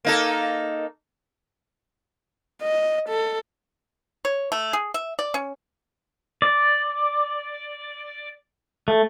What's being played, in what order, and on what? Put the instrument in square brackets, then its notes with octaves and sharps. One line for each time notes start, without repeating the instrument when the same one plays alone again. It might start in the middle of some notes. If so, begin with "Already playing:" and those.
[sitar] A#3 D#4 A4
[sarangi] D#5
A4
[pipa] C#5
A3
G#4
E5
D5
C#4
[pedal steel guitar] D5
A3